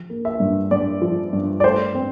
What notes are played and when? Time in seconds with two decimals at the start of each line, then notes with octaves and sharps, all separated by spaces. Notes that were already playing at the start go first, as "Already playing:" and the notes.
Already playing: F3
0.10 A#3
0.25 E5
0.40 G2
0.71 G2 D5
1.02 F3
1.33 G2
1.60 D5
1.64 A3 C5
1.95 C4